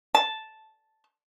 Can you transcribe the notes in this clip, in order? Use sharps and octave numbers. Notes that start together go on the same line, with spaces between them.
A5